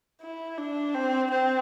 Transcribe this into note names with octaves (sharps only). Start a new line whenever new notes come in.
E4
D4
C4
C4